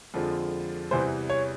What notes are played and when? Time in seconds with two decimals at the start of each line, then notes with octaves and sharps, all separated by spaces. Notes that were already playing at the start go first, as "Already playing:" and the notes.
0.14 F2 D3 F3 G#3
0.91 E2 C3 E3 G3 C5
1.30 C#5